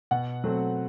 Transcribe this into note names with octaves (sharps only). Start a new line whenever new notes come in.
B2 F#5
F#3 A3 C4